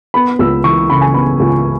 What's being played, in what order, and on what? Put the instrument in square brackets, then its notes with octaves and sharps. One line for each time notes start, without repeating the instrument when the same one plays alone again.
[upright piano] B3 B5
C#2 E6
E3 C#6
C#3 B5
G#5
B3 B5
C#2